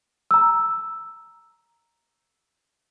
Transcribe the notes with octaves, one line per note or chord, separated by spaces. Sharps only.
A#5 E6